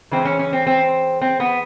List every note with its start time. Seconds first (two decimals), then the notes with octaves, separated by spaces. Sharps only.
0.11 C#3 E3 G#3 C4
0.25 C#4
0.39 C#4
0.53 C4
0.67 C4
1.21 C4
1.40 B3